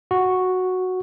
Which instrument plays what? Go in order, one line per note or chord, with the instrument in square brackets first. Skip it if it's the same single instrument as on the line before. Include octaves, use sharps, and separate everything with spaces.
[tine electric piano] F#4